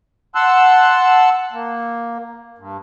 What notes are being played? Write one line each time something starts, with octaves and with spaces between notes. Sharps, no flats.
F#5 A5 C6 E6 F#6
A#3
G2